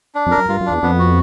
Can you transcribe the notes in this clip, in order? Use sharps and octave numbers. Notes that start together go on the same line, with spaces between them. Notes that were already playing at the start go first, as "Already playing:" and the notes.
D4
F2
A#4
F#2
G2 F4
F#2
E2 D4
F2 B3
F#4